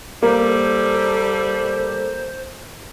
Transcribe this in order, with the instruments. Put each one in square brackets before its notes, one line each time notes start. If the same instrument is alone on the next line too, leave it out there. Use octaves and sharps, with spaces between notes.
[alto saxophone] G3 [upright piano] A#3 [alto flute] A4 [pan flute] C5